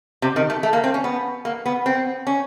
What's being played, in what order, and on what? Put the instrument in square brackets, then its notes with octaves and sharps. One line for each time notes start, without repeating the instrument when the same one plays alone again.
[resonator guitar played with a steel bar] C3
D#3
A3
A3
A#3
C4
C#4
B3
A#3
B3
C4
C#4